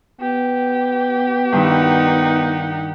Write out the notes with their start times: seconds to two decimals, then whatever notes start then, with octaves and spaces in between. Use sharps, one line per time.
0.21 B3 G4
1.52 G2 D#3 D#4 E4 F#5